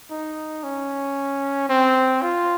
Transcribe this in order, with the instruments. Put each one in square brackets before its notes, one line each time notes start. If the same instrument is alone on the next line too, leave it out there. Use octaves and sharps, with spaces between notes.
[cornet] D#4
C#4
C4
F4